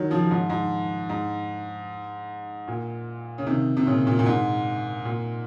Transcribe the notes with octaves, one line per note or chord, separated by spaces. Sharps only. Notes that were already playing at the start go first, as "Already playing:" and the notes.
Already playing: D#3 F#3
C#3 F3
G#2
G#2
G#2
A#2
C#3
C3 D#3
C3
A#2 C#3
A#2
A#2
G#2
A#2